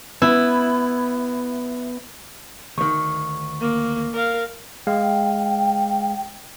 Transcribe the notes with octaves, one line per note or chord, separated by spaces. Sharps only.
B3 E4
D2 D#3 C#6
A#3
A#4 F5
G#3 F5 G5